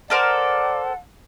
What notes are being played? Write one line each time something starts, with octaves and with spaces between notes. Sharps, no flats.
A4 A#4 C5 D5 F#5